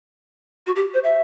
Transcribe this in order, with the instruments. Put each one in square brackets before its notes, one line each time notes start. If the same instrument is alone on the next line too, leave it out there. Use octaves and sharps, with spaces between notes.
[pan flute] F#4
G4
C5
E5